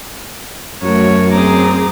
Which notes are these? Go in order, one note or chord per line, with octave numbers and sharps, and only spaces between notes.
F#2 A3 F#4 A#4 C#5
C4 G#4 A#5 D6